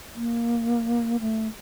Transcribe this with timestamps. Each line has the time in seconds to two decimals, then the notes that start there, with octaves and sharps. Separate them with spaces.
0.15 A#3
1.20 A3